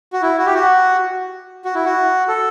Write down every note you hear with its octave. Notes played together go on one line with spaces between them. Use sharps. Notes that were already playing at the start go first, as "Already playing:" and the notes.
F#4
E4
F#4
G4
F#4
F#4
E4
F#4
A4